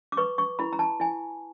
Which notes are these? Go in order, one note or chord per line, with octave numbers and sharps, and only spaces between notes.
D6
B4 C#6
C#6
E4 B5
A#5
A5
E4 G#5